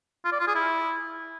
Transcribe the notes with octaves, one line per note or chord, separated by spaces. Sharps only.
F4
D5
F4
G#4
E4